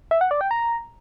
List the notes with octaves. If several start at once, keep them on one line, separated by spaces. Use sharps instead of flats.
E5
F#5
D5
G5
A#5